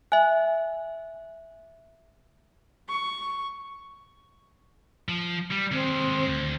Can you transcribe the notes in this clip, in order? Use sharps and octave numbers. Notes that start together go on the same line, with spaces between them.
E5 G#5 F#6
C#6
F3
G3
D#2 G#3 C4
D2